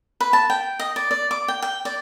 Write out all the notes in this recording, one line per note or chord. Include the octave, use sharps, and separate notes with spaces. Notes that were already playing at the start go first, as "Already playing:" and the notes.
B4
A5
G5
D#5
D5
D5
D6
G5
G5
D5